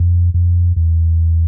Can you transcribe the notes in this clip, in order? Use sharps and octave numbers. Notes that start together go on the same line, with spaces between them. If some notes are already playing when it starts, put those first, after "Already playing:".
Already playing: F2
F2
E2